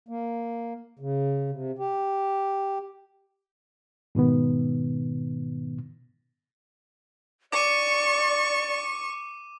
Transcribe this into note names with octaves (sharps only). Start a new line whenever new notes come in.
A#3
C#3
C3
G4
G#2 B2 D#3 B3
D5 C#6 D6 D#7